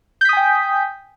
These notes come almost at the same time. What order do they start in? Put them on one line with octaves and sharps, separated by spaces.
G6 B6 D#6 G#5 G5